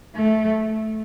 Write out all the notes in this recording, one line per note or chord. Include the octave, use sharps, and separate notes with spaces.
A3